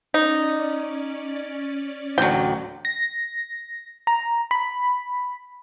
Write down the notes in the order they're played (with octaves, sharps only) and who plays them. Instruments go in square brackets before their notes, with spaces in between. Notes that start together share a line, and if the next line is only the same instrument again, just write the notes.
[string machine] C#4 D5 [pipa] D#4
[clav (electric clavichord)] A1 D2 F#3 [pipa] G5
[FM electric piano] A#6
A#5
B5